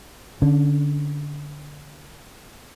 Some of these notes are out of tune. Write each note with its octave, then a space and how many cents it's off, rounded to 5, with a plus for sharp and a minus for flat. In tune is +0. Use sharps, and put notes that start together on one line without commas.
D3 -5 C#4 +10